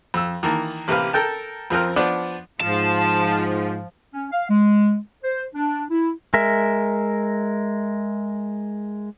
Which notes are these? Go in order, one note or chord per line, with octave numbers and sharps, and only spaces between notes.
F2 E6
D#3 E3 A#3 A5
A1 C3 A#3 B4 F5
A4 A#4 G5 A5
F2 F3 C4 A#4 F6
F3 B3 D4 D5
G#2 F3 A5
C#4
F5
G#3
C5
D4
E4
G#3 A#4 E5